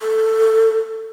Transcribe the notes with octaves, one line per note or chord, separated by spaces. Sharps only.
A4